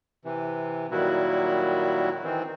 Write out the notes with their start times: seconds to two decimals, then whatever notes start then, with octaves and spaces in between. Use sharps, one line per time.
0.25 C3 E3
0.91 A#2 D#3 F#3 G3 E4 F#4
2.24 D#3 E3 C4